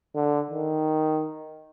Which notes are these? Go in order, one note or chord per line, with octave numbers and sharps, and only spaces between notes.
D3
D#3